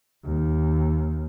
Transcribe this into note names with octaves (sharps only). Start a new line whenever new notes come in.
D#2